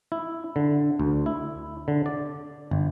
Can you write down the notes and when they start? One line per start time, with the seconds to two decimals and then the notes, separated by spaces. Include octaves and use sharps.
0.12 E4
0.56 D3
0.99 D2
1.26 E4
1.88 D3
2.06 D5
2.71 G1